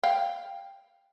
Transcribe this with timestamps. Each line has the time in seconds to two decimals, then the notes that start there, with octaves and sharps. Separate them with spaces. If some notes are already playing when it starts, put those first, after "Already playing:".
0.03 F5 G5